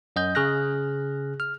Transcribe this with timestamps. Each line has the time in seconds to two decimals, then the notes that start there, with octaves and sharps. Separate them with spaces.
0.16 F#2 D#5 G6
0.35 C#3 G#4 F6 F#6 A#6
1.40 F6